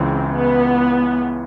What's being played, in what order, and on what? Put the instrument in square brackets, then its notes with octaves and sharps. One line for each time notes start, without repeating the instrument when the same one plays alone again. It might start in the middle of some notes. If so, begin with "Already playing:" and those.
Already playing: [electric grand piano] C#2 C#3 E3 [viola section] C4
[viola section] B3